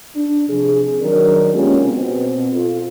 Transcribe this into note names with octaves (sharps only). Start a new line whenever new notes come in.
D4
C3 F3 G#4
D#3 F#3 D4 A#4
G#3 A#3 B3 C#4 F4 G4
B2 C4
F4 A4